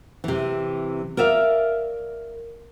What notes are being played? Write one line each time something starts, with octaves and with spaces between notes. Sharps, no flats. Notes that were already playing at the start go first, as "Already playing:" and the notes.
C3 E3
A#4 D5 E5 F5